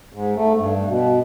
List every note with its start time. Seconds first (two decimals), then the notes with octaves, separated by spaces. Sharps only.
0.13 G#2
0.36 A3
0.57 G2
0.88 B2